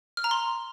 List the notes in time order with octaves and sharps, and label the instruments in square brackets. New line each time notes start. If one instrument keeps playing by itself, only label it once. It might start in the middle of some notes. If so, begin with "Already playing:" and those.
[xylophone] F6
A#5
C6